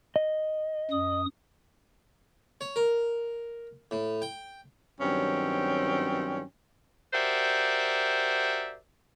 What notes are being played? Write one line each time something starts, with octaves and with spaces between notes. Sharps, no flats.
D#5
F#2 D#6
C#5
A#4
A2
G5
G2 D#3 F#3 C4 C#4 G5
F#4 G4 A#4 C5 D5 E5